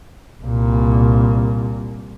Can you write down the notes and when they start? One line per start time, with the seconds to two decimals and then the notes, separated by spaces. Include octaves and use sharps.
0.43 C2 A#2